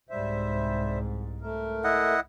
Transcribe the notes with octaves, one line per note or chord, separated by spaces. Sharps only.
C2 G#2 G3 C5 E5
A3 A#4
E4 D#5 F#5